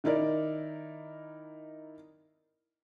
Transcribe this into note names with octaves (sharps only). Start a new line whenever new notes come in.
D#3 D#4 E4 A#4 D5